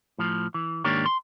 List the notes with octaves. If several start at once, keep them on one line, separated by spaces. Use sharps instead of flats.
A2 F3
E3
G#2 D#3 A#3 D4 G4 C#5
C6